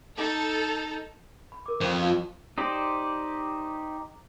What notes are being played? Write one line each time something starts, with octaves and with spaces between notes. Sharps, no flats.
D#4 A4
B5
A#4 D6
F2 C5 G5
F4 F5
D#4 G4 C5 D5